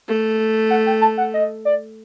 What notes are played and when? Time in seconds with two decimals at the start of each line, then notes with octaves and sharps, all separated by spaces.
0.08 A3
0.70 F#5
0.86 G5
1.01 A5
1.18 F#5
1.34 D#5
1.65 D5